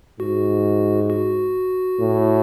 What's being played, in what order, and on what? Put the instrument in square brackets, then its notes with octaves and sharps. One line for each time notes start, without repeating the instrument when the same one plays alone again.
[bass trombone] G#2 [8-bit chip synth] F#4
[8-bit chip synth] F#4
[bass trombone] A2